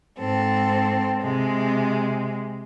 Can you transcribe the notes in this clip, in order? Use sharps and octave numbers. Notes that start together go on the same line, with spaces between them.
G#2 C4 A4
C3 G#3